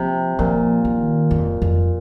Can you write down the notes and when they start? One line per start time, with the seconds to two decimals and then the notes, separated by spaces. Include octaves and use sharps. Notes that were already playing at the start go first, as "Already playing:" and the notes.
Already playing: C3 F3
0.39 A#2 F3
0.85 D#3
1.31 F2
1.62 F2